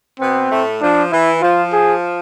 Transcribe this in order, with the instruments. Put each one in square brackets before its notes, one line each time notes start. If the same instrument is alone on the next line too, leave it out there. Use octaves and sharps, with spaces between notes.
[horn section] B2 B3 [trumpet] C4
[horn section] A2 A3
[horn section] F3 [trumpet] D4
[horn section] E3 [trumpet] E4
[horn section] F3 [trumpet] F4
[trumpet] G#4